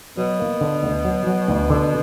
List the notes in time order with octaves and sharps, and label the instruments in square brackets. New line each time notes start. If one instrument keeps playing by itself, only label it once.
[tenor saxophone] B2 [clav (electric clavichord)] F#3
[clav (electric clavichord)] A#3
D3
D2
F#3
F#3
D2
D3